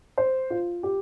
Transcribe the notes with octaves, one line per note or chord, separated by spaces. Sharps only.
C5
F4
G4